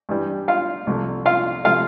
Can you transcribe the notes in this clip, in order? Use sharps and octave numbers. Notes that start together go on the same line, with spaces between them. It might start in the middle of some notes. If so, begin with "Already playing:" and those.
G2 E3 G3
F4 F5
C2 C3 F3 A3
F4 F5
C3 F3 A3 F4 F5